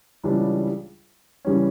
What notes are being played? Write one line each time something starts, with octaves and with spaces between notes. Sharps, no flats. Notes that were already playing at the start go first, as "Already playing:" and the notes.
C#2 C#3 E3 G3 D4
C#3 E3 G3 C#4